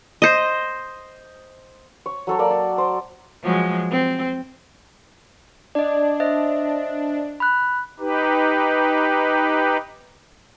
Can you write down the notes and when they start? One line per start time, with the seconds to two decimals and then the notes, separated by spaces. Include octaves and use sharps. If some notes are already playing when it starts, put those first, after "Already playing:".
0.22 C5 D#5
2.06 C#5
2.27 F#3 A4 C#5
2.39 A#3 A4 D5
2.51 A4
2.78 C5
3.43 F3 F#3 G#3
3.91 C4
5.75 D4 D5 D#5
6.20 C5 D#5 E5
7.40 B5 F#6
8.00 D#4 G4 B4